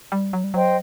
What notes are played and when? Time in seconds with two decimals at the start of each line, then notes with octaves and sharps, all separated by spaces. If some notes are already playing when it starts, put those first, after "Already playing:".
0.12 G3
0.33 F#3
0.44 G3
0.54 F#3 C5 D#5 G5